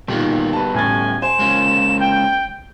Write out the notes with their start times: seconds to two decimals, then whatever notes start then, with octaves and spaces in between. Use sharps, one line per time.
0.08 A#2 D#3 G3 B3 F#4
0.53 B4 A5
0.74 A2 C#4 G#5 A6
1.22 C5 G#5 E7
1.39 G#3 A#3 C#4
2.00 G5